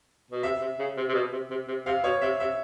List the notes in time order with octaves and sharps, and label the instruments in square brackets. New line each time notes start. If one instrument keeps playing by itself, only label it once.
[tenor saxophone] B2
[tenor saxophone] C3 [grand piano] E5
[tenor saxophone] C3
C#3
C3
C3
B2
C3
C3
C3
[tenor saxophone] C3 [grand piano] F5
[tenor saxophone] B2 [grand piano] C#5
[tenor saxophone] C3 [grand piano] E5
[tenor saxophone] C3 [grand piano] E5